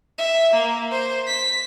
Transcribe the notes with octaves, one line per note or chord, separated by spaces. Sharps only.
E5
A#3
C5
B6